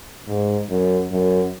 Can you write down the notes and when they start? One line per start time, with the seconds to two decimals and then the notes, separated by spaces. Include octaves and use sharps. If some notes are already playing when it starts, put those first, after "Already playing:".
0.28 G#2
0.69 F#2
1.11 F#2